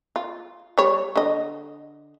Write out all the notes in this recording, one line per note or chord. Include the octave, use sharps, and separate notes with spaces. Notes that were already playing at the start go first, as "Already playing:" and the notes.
F4
G3 C#5
D3 D#5